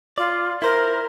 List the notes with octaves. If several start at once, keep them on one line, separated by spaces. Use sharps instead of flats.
F4 D5
E4 A#4 C5